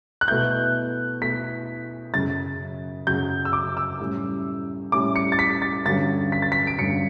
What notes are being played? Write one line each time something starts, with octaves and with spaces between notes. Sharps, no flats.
F#6
B2 A3 E4 G6
B2 A3 E4 B6
F#2 C#3 F#3 A6
F#2 C#3 F#3 G6
E6
D6
E6
A2 G3 C#4 E4
A2 G3 C#4 E4 D6
C#7
A6
B6
A6
G2 D3 F#3 C#4 A6
B6
A6
B6
D7
G2 D3 F#3 C#4 C#7